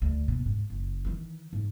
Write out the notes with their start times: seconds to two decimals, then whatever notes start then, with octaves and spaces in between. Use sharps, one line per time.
0.02 D2
0.28 B2
0.46 G#2
0.70 F#1
1.05 D#3 E3
1.53 G#2